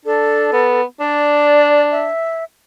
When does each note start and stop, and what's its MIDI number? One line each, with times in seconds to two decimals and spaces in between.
0.05 0.47 62
0.05 0.81 69
0.53 0.83 59
1.00 2.07 62
1.00 1.83 74
1.91 2.44 76